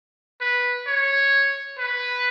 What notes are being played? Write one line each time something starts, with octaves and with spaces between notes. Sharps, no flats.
B4
C#5
B4